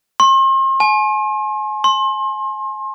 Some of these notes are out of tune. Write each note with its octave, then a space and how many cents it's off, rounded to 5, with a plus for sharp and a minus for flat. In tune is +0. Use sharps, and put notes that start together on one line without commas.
C6 +40
G#5 +35
C6 +35